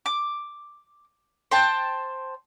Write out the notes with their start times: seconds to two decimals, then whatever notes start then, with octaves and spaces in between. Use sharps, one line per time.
0.06 D6
1.51 C5 G5 A5